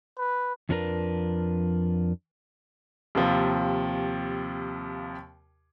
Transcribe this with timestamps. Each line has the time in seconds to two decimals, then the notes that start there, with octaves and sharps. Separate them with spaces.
0.18 B4
0.69 F2 F3 C#4 D4 A#4 B4
3.15 D#2 C3 F3